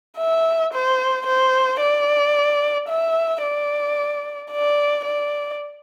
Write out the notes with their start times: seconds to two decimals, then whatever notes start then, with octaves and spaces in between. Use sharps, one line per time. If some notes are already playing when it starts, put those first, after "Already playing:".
0.17 E5
0.73 C5
1.26 C5
1.80 D5
2.88 E5
3.42 D5
4.51 D5
5.05 D5